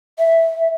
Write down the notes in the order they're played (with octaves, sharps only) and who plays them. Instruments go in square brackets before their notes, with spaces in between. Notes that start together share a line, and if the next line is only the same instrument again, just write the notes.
[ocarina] E5